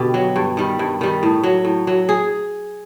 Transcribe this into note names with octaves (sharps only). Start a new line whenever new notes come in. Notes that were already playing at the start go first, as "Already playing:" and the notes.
Already playing: B2 D3 G4
F#3
G2
D#3 G3
G2
D#3 G3
A2
F#3
A2
F#3
G#4